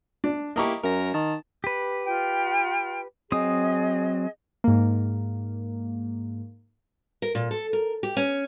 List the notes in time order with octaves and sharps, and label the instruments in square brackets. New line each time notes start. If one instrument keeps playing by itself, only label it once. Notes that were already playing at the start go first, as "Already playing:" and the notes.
[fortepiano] D4
[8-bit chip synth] A#3 E4 G4 [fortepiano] D#5 A#5 C#6
[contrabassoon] F#2 [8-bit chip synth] A#4 A#6
[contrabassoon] D#3 [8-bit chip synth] A5
[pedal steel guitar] G4 B4
[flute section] F4 G5
[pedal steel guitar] F#3 C4 D#6 [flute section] G#4 D#5
[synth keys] G#2 A#3
[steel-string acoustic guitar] A#4
A#2
A4
A#4
G4
C#4